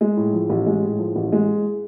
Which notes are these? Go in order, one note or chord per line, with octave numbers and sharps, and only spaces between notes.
G#3
A2
F3
A1
G#3
A2
F3
A1
G#3